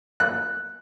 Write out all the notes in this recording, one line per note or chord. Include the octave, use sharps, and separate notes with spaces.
F#6